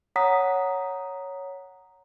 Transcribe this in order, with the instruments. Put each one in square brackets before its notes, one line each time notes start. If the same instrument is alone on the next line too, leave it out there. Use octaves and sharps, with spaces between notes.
[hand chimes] C#5 F#5 A#5 D#6 B6